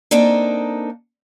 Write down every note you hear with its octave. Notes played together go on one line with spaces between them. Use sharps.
A#3 C4 D4 D#4 A4